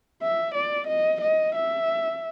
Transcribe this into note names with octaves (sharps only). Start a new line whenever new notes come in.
E5
D5
D#5
D#5
E5